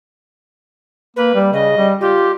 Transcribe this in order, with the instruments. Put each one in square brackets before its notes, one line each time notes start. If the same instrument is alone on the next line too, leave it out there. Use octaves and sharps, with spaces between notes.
[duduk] A#3 [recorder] B4
[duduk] G3
[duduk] C#3 [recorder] D#5
[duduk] G3
[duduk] F4 [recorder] G4